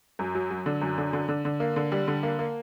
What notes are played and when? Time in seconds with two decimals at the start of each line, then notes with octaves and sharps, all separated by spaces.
0.19 F#2
0.35 F#3
0.51 F#3
0.66 D3
0.81 F#2
0.98 D3
1.13 D3
1.28 D3
1.45 D3
1.60 A#3
1.76 D3
1.92 G3
2.08 D3
2.23 A#3
2.39 A#3